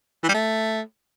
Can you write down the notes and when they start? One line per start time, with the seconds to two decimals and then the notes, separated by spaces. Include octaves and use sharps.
0.23 E3
0.29 G3
0.34 A3